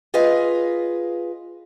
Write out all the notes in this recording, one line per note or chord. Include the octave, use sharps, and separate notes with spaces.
F4 G#4 B4 D#5 F5